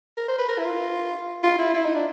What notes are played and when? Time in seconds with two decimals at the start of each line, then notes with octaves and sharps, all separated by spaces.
0.17 A#4
0.28 C5
0.38 B4
0.48 A#4
0.58 E4
0.65 F4
1.43 F4
1.58 E4
1.74 E4
1.85 D#4
1.95 D4